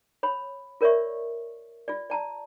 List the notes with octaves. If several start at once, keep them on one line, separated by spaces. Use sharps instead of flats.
C#5 B5
F4 A#4 C#5 D5 E5 C#6
F4 D5
D5 A5 A#5